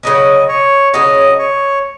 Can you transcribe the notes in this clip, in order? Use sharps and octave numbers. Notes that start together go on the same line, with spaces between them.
C#3 F#3 C#4 D#5
C#5
C#3 F#3 C#4 D#5
C#5